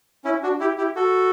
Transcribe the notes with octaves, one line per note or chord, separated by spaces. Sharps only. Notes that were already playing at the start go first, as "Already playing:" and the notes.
C#4 E4
D4 F#4
E4 G4
E4 G4
F#4 A4